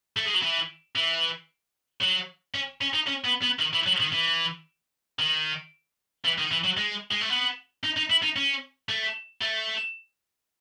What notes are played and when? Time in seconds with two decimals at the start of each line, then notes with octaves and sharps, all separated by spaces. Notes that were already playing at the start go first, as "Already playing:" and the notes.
0.17 A3
0.26 G#3
0.34 F#3
0.42 E3
0.96 E3
2.01 F#3
2.54 C#4
2.81 C#4
2.94 D#4
3.07 C#4
3.25 B3
3.42 B3
3.59 D#3
3.73 E3
3.86 F#3
4.00 D#3
4.12 E3
5.19 D#3
6.25 E3
6.38 D#3
6.51 E3
6.64 F#3
6.77 G#3
7.12 G#3
7.21 A3
7.30 B3
7.84 D#4
7.97 D#4
8.10 E4
8.23 D#4
8.36 C#4
8.89 A3
9.41 A3